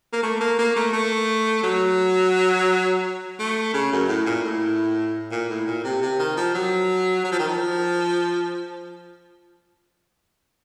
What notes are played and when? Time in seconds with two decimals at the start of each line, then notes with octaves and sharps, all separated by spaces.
0.13 A#3
0.23 A3
0.41 A#3
0.58 A#3
0.76 A3
0.93 A3
1.64 F#3
3.39 A3
3.74 C#3
3.92 F#2
4.08 A2
4.26 A#2
4.44 A2
5.32 A#2
5.49 A2
5.67 A#2
5.84 C3
6.02 C3
6.19 D#3
6.37 F3
6.54 F#3
7.24 F#3
7.32 F3
7.39 D#3
7.48 F3